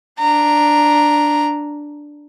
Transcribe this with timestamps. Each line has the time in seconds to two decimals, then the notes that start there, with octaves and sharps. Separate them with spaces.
0.19 D4 A#5